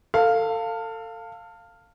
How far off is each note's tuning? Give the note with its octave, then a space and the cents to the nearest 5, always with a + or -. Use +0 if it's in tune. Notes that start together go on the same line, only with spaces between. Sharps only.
A4 +30 F5 +0